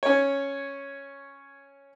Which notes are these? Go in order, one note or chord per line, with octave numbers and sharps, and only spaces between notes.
C#4 C#5